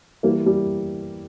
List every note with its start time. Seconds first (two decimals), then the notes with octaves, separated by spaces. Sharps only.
0.23 E3 G3 A#3
0.46 G3